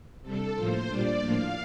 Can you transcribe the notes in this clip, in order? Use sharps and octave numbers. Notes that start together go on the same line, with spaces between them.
C3 G3 D4 A4
A2 F3 A#3 F4 C5
A#2 G3 D4 F4 D5
A2 F3 A#3 D4 F5